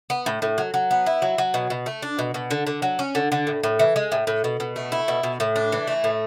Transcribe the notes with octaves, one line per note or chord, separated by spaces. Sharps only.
B3
A2
A2
F#3
F#3
B3
E4
F#3
F#3
B2
B2
A3
D4
B2
B2
D3
D3
F#3
C#4
D3
D3
A2
A2
E3
G#3
A2
A2
B2
B2
A3
E4
B2
B2
A2
D4
E3
A3
A2